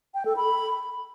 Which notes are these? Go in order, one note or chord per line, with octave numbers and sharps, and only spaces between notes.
G5
A4
B5